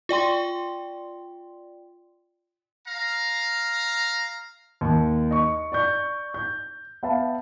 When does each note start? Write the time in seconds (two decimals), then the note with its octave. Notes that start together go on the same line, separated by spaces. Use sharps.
0.09 F4 D5 G5 C6
2.88 F5 A#5
4.81 D#2
5.31 D#5 C#6
5.72 D5 C#6 G6
6.34 G6
7.03 B3 E5 F5 A5